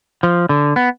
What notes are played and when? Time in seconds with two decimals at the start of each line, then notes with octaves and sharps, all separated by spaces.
0.23 F3
0.49 D3
0.76 B3